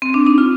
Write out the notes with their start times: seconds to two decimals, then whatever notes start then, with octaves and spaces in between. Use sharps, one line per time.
0.02 C4
0.14 D4
0.27 D#4
0.38 F4